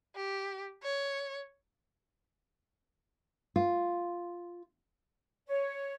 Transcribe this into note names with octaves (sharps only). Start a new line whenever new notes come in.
G4
C#5
F4
C#5